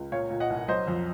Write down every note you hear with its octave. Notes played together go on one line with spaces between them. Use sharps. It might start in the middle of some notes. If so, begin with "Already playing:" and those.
Already playing: C#2
A#2 C#5 F5
A#2
D#5 F#5
C2
F#3 C5 D#5
F2